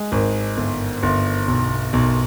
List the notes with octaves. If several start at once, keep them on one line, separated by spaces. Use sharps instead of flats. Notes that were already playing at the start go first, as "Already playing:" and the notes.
Already playing: G#3
G#1
G1
G1
B1
B1